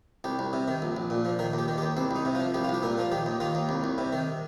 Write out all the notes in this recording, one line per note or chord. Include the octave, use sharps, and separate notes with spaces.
C2 G4
C2
C3
D#3
A#1
A#1
A#2
F3
D#3 A#4
D#2
G4
D#3
G4
D#2
C2 C4
C2 D#4
C3
F4
F3
C2 G4
F4
C2 G4
A#2 A#4
F3 F4
D#3 G4
D#2
D#3 F4
D#2
C2
C2
C3
D#3